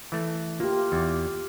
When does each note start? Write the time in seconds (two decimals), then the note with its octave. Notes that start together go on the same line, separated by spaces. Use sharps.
0.12 E3 A3
0.60 A#3 F4 G4
0.92 E2